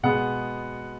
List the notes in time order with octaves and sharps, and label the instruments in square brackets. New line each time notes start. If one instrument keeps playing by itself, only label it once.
[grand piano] B2 G#3 B3 F#5